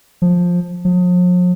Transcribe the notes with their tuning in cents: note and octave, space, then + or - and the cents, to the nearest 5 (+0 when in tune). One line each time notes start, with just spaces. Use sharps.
F3 +15
F3 +45